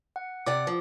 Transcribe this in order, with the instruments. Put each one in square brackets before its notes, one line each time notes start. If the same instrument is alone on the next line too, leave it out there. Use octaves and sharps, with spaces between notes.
[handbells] F#5
[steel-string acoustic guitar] C3 D5 F#5 [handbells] D6
[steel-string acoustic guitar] F3